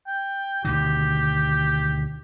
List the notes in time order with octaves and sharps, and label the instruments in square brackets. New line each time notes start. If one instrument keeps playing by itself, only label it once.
[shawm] G5
[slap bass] D2 B2 D#3 [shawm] G4